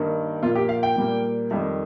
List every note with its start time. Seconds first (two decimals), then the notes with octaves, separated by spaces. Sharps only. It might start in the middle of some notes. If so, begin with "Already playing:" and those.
Already playing: G2 D#3 A#3
0.42 A#2 F3 A#3 F4
0.55 G4
0.69 F5
0.83 G5
0.96 A#2 G3 A#3
1.51 F2 D#3 G3